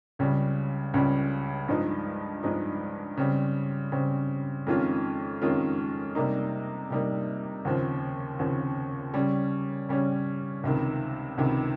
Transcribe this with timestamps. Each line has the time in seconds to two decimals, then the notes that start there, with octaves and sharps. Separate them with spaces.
0.19 C#2 C#3 G3
0.94 C#2 C#3 G3
1.68 G2 F3 G#3 D#4
2.43 G2 F3 G#3 D#4
3.17 C#3 G3 C4
3.92 C#3 G3 C4
4.67 F2 D#3 G#3 C#4 F4
5.42 F2 D#3 G#3 C#4 F4
6.15 C3 G3 A#3 D#4
6.90 C3 G3 A#3 D#4
7.65 D#2 C#3 F3 C4
8.39 D#2 C#3 F3 C4
9.14 C#3 G3 C#4
9.89 C#3 G3 C#4
10.63 C#2 C3 D#3
11.38 C#2 C3 D#3